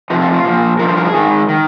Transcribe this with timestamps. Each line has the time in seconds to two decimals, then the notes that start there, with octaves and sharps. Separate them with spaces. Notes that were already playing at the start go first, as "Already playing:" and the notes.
0.10 F2 C3 F3 D#4
0.22 F4
0.33 F4
0.45 A#2 F3
0.79 F3 A#4
0.83 G2 C5
0.97 A#4
1.05 G#4
1.14 G#2 D#3
1.49 D#3